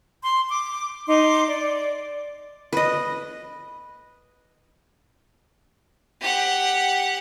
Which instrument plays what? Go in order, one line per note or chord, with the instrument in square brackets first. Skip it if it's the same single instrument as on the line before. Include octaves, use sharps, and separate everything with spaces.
[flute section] C6
D6
D#4 C6 D6
D5
[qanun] B4 D#5
[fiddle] G4 F#5